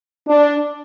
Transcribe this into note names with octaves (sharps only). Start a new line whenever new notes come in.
D4